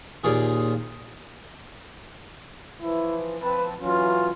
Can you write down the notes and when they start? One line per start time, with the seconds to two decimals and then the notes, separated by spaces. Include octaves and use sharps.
0.24 D#2 A#2 F4 G#4
2.82 E3 F3 E4
3.43 F3 C4 B4 A5
3.81 E3 F#3 C#4 F4